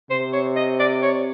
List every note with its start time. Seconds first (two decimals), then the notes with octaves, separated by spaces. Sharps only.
0.10 C3 C5
0.33 C#5
0.56 D#5
0.79 D5
1.03 C#5